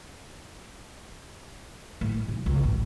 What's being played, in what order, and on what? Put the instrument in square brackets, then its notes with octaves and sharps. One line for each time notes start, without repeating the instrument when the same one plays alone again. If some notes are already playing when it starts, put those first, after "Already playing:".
[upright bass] A2
B1
C#2
A1